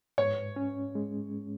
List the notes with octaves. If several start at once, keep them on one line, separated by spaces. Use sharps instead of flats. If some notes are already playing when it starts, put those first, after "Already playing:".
G#2 C#5
C#4
G#3